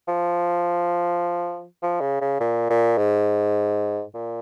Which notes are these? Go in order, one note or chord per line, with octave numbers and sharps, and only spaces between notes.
F3
F3
C#3
C#3
A#2
A#2
G#2
A#2